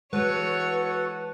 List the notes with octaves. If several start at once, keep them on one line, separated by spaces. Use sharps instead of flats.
E3 G#3 F#4 A4 B4 C#5 F#5